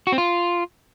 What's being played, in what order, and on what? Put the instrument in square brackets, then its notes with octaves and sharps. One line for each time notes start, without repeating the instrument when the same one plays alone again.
[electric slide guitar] F#4
C4
F4